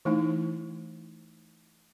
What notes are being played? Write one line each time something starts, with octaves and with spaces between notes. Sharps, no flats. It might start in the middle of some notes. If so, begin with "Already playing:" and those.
E3 A3 D#4 E4